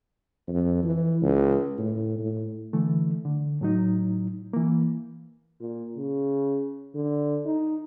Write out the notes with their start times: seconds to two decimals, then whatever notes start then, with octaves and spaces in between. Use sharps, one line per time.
0.48 F2
0.83 E3
1.22 C#2
1.78 A2
2.18 A2
2.73 D3 E3 A3
3.25 D3
3.61 A2 F#3 D#4
4.53 E3 A#3
5.60 A#2
5.97 C#3
6.95 D3
7.46 D#4